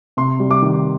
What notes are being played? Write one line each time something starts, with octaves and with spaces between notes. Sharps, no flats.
C3 C6
G3
D6
D#3